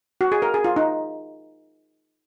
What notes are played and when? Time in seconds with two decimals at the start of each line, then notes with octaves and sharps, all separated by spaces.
0.21 F#4
0.32 G#4
0.42 A#4
0.54 G#4
0.65 F4
0.76 D#4